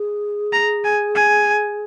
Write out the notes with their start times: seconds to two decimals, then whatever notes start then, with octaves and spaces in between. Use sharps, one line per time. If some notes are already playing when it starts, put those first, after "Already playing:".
Already playing: G#4
0.53 A#5
0.84 G#5
1.15 G#5